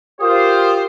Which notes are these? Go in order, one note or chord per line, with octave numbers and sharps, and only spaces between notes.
F4 G4 A#4 C5 D#6